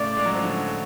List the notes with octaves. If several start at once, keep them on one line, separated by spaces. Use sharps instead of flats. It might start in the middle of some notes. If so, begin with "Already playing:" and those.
Already playing: A2 C#3 D5
G#3
F#3
F3
D3 F#3